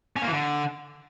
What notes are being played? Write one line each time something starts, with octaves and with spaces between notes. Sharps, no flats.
C#4
A#3
E3
D3